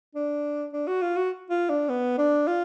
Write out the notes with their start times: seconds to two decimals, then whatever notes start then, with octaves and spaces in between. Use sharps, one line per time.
0.15 D4
0.73 D4
0.87 F#4
1.02 F4
1.17 F#4
1.50 F4
1.70 D4
1.89 B3
2.18 D4
2.47 F4